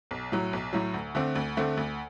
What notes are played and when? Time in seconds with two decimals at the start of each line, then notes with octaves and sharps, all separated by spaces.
0.11 B1
0.32 A2 F#3
0.53 B1
0.73 A2 F#3
0.94 D2
1.15 D3 A3 C4
1.35 D2
1.57 D3 A3 C4
1.77 D2